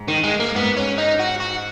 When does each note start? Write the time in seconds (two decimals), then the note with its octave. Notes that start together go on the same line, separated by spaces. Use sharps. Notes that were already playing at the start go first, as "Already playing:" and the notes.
Already playing: G#2
0.08 D#3
0.23 G#3
0.40 A#3
0.55 G#2 B3
0.77 C#4
0.98 D#4
1.19 F#4
1.40 F#4